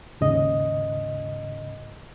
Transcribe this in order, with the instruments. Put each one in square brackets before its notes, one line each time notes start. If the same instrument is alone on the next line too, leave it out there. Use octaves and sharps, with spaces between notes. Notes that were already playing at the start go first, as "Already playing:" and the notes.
[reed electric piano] D#2 G#2 C#3 D#5